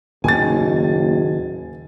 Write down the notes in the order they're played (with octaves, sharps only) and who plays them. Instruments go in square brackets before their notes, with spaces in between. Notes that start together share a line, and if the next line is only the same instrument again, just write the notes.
[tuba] F#1 [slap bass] D#2 A2 D#3 [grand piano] G#5 A6